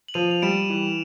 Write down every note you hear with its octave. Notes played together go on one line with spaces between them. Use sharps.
F#7
F3 D#7 F7
F7
G3 D7 E7
E3